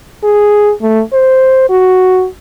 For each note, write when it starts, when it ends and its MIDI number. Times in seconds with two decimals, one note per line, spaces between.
0.24 0.72 68
0.82 1.01 57
1.13 1.65 72
1.69 2.27 66